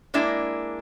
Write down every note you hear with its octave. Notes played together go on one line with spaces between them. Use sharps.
G#3 A#3 D4 E4